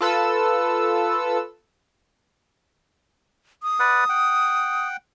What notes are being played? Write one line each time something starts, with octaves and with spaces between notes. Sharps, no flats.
F4 A4 B4 E6
D#6
B4 D5 F#5
F#5 G5